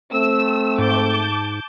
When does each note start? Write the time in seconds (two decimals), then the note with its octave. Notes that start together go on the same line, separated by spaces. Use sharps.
0.12 A3 C4 E6
0.79 G#2 A5 D6 G6